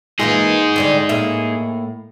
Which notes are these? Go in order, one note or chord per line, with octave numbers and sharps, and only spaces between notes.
E3 A#3 D#4 F4 G#4
D3 G3 C4
A2 A#3 E5